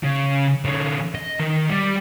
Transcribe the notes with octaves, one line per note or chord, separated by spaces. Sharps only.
C#3
D3 C#4
D#5
D#3
G3